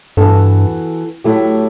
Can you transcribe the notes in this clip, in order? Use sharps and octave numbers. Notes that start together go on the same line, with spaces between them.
G2 E3 B3 F#4 A4
A2 F#3 A3 E4 G4